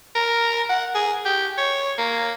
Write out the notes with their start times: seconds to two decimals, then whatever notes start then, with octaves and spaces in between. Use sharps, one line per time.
0.15 A#4
0.69 F#5
0.95 G#4
1.25 G4
1.58 C#5
1.98 A#3